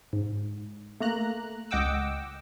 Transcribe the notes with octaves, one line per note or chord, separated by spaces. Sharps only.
G#2
A3 A#3 A#5 F#6
C#2 D#5 F#5 G5 D6 E6